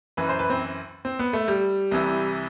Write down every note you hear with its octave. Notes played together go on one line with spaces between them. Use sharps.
F#2 E3 B4
C5
B4
C4
C4
B3
A3
G3
C2 C3 E3